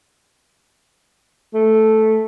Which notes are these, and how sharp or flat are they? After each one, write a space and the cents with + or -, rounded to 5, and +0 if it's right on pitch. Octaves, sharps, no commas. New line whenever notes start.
A3 -5